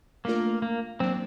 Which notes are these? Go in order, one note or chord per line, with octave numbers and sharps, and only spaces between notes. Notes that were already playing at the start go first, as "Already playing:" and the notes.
A3 A#3 D4 F4 A#4
A#3
F#3 A#3 C4 D4